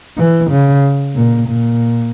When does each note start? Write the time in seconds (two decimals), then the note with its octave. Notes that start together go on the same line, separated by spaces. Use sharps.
0.18 E3
0.51 C#3
1.15 A#2
1.48 A#2